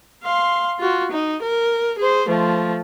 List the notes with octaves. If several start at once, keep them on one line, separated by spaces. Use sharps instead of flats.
F5 C6
F4 F#4
D#4
A#4
G#4 C5
F3 A3